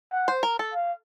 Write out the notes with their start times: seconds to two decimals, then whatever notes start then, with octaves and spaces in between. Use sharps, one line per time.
0.12 F#5
0.28 C5
0.43 A#4
0.59 A4
0.74 F5